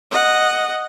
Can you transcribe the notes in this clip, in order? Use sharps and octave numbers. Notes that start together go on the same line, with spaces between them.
D#5 F#5